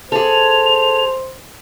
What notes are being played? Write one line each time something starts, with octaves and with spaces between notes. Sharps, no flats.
G#4 A4 C5 F7